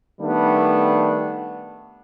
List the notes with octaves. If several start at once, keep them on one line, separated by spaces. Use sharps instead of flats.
D#3 G3 A3 B3 D4